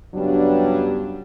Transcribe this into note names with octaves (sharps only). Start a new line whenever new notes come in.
G2 C#3 F#3 G3 B3 D4